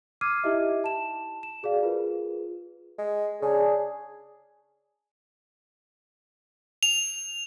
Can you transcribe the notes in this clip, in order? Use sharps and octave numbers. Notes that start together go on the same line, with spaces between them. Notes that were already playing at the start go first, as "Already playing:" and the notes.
D6 E6 F6 G#6 C7 D#7
D#4 E4 G4 D#5 E5
A5 E7
E7
F#4 G#4 D5 F5
F4 G#4 A#4 B4
G#3
C#3 D4 G#4
F7